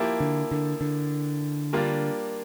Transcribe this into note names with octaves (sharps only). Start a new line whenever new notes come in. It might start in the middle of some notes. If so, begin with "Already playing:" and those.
Already playing: F3 A#3 E4 G4
D3
D3
D3
G3 A#3 D4 F4